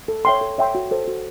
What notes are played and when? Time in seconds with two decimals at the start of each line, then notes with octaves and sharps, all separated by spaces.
0.08 A4
0.25 C#5 E5 G5 C6
0.41 A4
0.58 C#5 E5 G5 C6
0.75 F#4
0.91 A4 C5
1.08 F#4